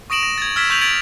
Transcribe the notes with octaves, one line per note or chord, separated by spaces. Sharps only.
C#6 D#6 A#6 D7 E7 F#7
A#6
G#6 A6
E6 F6 G#6 A6 B6 E7
C#6 G6 B6 F7 F#7
G#6 A6 D7 F#7